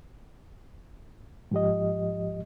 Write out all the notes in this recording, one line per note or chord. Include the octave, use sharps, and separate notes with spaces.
G#2 F3 G4 D#5